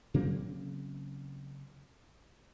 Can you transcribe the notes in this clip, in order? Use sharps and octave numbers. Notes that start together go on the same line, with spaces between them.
C#3 F#3 A#3 C4